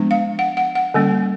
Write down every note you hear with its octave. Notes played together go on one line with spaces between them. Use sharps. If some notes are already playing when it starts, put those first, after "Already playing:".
Already playing: F3 G#3 B3 D4
F5
F#5
F#5
F#5
D3 G3 A#3 C#4